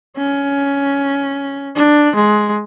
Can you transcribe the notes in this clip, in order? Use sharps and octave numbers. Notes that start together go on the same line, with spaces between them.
C#4
D4
G#3